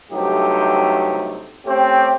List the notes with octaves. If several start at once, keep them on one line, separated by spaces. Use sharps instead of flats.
G2 C3 F#3 A3 D#4 G4
A3 C4 C#4 G4